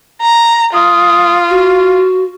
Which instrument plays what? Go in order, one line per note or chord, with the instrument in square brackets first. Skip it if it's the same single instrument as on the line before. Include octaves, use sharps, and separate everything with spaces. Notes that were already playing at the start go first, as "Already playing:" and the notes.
[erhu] A#5
[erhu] F4 [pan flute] D#6
[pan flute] F#4